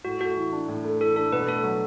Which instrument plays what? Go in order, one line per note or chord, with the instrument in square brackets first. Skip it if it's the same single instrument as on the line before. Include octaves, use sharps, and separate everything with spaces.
[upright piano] A2 [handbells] F#4
[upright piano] A3 [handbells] F#4
[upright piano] E3
D4
A2
A3
[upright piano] E3 [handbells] A4
[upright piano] D4 [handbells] A4
[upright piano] B2 [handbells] B4
[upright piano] A3 [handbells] A4
[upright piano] F#3